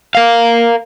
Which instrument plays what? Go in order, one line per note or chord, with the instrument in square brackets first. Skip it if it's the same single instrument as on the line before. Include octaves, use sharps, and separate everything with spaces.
[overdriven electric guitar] A#4 F5